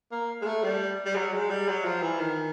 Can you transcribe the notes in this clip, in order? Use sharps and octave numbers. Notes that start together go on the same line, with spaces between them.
A#3
G#3
A3
G3
G3
F#3
G#3
G3
F#3
F3
E3
D#3